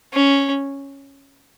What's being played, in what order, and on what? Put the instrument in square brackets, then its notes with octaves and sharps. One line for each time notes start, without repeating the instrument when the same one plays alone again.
[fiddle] C#4